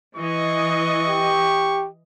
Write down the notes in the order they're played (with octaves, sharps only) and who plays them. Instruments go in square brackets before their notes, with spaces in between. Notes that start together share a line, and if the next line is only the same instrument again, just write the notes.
[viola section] E3 D#5 [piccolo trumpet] C#6
[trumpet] G4